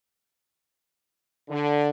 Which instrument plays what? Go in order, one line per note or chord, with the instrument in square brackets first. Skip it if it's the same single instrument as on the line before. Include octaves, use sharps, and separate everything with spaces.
[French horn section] D3